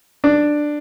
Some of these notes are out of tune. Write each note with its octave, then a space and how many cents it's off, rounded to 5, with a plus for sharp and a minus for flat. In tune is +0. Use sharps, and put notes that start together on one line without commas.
D4 +10